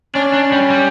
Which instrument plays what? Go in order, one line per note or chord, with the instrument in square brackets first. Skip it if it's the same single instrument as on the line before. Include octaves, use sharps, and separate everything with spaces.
[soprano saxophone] C#4 [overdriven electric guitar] D4
[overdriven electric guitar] D4
G3
G3